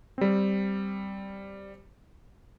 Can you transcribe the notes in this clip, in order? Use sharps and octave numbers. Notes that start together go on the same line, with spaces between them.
G3 C4